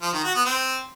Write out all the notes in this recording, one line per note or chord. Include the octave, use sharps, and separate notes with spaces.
F3
D#3
F#4
B3
C4